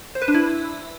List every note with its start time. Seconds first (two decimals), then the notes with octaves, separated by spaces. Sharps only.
0.15 C5
0.22 B4
0.28 D4
0.34 E4